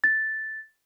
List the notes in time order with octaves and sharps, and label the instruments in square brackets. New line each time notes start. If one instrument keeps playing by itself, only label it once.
[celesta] A6